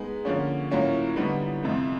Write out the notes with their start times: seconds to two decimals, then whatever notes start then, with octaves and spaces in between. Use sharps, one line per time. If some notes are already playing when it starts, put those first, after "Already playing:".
Already playing: G#3 B3 D#4
0.25 D3 F3 A#3 C#4
0.70 A2 F#3 A#3 C#4 F4
1.16 D3 G3 B3 D#4
1.62 F2 C3 F3 A3